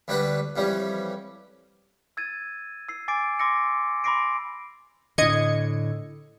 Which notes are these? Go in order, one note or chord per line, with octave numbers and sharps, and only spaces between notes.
D2 G3 D4 F#4 B4
F2 E3 G3 C#4
E6 G#6 A6 D#7
E6 C7
G#5 D6 A6 C7 D7
C6 D6 E6 A#6 C#7
B5 C6 D6 A#6 C7 D7
A2 D3 D#5 G#6 C#7